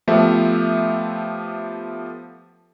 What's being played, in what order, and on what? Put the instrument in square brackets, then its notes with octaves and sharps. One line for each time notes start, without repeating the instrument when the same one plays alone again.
[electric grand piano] F3 A3 B3 G4 E5